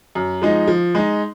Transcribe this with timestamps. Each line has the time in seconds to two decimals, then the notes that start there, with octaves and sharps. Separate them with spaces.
0.15 F#2
0.42 F3 G#3 D#4
0.68 F3
0.95 G#3 D#4